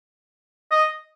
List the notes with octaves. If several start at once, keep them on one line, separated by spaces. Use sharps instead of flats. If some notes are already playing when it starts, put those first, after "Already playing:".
D#5